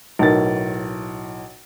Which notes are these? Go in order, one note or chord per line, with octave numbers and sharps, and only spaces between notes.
B1 A2 F#4 A#4 A6